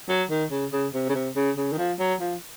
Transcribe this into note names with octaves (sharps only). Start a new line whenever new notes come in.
F#3
D#3
C#3
C#3
C3
C#3
C3
C#3
C#3
D#3
F3
F#3
F3